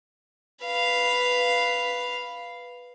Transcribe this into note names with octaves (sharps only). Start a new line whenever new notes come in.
B4 F5